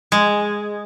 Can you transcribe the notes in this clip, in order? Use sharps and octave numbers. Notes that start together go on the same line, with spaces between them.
G#3